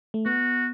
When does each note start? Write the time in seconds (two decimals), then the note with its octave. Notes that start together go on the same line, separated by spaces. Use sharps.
0.14 A3
0.25 B3 F#4